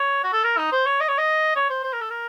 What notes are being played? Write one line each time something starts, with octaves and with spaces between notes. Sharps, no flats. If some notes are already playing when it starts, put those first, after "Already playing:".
Already playing: C#5
F#4
A4
A#4
D#4
C5
C#5
D#5
C#5
D#5
C#5
C5
C5
A#4
A4
A#4